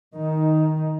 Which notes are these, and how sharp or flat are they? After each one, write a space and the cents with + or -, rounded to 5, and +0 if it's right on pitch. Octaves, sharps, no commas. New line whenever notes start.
D#3 +0 D#4 +10